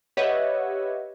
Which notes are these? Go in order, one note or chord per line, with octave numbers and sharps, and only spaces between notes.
G4 B4 C#5 D#5 E5 F#5